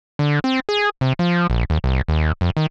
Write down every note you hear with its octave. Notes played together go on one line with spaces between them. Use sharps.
D3
C4
G#4
C3
F3
A#1
D#2
C2
D#2
F2
D#3